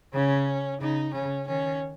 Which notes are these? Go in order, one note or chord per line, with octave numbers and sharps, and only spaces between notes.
C#3 C#4
C#3 D#4
C#3 C#4
D#3 C#4